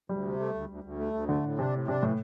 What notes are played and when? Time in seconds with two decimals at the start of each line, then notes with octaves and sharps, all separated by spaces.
0.09 D2 G3
0.25 C3
0.40 A3
0.54 D2
0.69 D2
0.84 D2
0.99 A3
1.14 D2
1.28 D3 A3
1.43 A2
1.58 C3 D4
1.73 A2
1.88 C3 D4
2.02 A2 E3